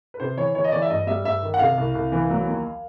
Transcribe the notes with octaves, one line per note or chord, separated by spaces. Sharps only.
B4
C3 C5
E3 C#5
E3 C#5
D#5
E3 D5
E5
G2 D#5
G3 E5
G2 E5
D#3
F#5
C3 F5
C2
C2
E3
F#3
D#2